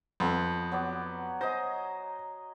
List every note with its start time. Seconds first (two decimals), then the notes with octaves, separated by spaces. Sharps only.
0.20 F2 B3
0.72 F#3 B3 D5
1.41 C5 D#5 G#5 A#5